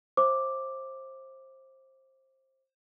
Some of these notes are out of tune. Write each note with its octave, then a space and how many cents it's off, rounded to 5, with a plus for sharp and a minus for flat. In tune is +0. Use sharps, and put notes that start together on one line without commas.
C5 +20 E5 +0 D6 +0